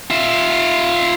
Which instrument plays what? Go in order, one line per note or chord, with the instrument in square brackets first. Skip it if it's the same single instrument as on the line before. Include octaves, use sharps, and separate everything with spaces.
[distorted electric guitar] F4 E5